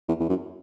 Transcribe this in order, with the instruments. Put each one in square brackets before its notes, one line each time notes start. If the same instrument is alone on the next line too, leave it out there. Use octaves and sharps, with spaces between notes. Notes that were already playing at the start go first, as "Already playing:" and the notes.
[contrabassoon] E2
E2
F#2